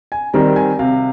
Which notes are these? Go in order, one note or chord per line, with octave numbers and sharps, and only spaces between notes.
G#5
D#3 G3 C4 A#5
G#5
C3 F5